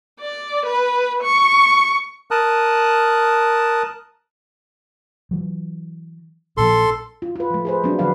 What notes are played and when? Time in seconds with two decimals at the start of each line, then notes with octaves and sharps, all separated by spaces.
0.20 D5
0.65 B4
1.23 C#6
2.31 A#4 A5 D#6 F#6
5.31 E3 F#3
6.57 A#1 A#2 F3 A4 C6
7.22 F4
7.36 F4 B4
7.50 F3 A3
7.65 G#4 B4 C5
7.84 F#3 B3 C4 D4
7.99 D3 F3 F#3 B4 F5